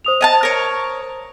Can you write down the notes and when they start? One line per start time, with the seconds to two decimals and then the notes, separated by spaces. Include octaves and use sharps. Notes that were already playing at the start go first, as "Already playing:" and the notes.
0.05 C5 D#6 F7
0.21 D#5 G#5 A5
0.43 A#4 C#5